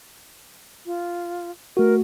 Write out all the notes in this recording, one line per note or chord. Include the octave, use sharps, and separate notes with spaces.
F4
A3 F#4 A#4